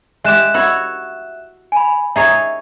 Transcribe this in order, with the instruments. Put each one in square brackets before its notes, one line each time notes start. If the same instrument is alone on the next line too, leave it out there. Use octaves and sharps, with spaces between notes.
[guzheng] G#3 G4 [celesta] E5 F#6 E7
[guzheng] E4 F#4 C#5
[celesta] G#5 B5
[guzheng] D#4 G#4 C#5 [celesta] E5